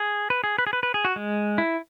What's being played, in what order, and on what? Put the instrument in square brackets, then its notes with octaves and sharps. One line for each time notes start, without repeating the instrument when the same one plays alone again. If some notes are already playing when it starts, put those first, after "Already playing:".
Already playing: [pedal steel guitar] G#4
B4
G#4
B4
G#4
B4
B4
G#4
F#4
G#3
E4